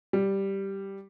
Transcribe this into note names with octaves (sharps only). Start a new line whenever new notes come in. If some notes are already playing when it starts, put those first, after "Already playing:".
G3